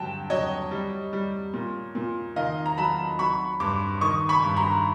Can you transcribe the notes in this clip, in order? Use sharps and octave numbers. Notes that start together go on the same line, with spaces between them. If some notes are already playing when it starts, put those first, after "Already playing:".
Already playing: G2 D3 F#3 G5 A5
F#3 C#5 D#5
G3
G3
A#2
A#2
D#3 D#5 F5
A#5
F#3 A5 B5
F#3 B5 C#6
G2 C6 D6
D#3 C#6 D#6
B5 C#6
G2
A#5 C6